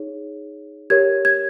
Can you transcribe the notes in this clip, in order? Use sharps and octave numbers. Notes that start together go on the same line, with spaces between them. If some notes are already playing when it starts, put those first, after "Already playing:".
Already playing: D#4 G#4 C#5
G4 A#4 C#5 G#6
G#6